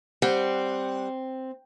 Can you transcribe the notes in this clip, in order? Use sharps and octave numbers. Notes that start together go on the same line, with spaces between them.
G3 C4 F#5